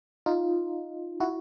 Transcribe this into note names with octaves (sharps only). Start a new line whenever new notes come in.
D#4 F4
E4 F#4